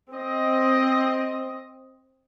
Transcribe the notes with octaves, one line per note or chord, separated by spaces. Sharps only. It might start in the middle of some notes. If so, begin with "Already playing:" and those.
C4 D#5